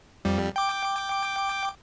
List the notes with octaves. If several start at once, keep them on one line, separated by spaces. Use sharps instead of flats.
F2 G3
G5 D6